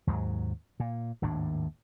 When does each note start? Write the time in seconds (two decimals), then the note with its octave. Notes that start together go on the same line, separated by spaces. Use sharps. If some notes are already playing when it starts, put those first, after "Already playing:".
0.07 D#2 G#2 F#3
0.80 A#2
1.22 G#1 D#2 A2 D4